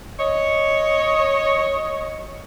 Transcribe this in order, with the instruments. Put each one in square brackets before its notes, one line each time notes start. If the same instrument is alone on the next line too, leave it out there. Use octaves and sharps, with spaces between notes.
[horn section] C#5 D#5